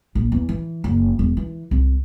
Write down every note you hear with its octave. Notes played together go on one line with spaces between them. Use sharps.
A#1
E2
E3
F#1
E1
E3
C2